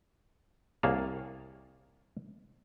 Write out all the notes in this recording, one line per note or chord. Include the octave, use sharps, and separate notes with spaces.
C2 A#3 G#4 C#5 A5